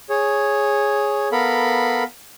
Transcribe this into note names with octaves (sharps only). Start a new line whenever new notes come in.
G#4 C#5
B3 A4 A#4 F5 B5